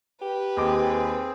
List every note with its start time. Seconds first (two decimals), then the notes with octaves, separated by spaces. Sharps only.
0.22 G4 B4
0.57 D#2 C4 G#4 D#5 D6